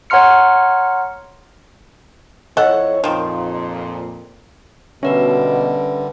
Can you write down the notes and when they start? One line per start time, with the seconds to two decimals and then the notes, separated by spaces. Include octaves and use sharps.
0.10 C#5 F#5 A#5 C6 F6 C#7
2.57 F2 E4 A4 C#5 D#5 F#5
3.04 F2 A#2 D#3 F3
5.03 B2 D3 G3 C#4 A#4 B4 E5